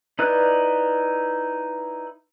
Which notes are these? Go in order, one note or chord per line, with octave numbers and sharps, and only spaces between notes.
D#4 E4 B4 D5 F#6